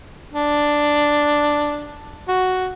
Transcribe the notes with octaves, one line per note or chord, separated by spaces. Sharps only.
D4
F#4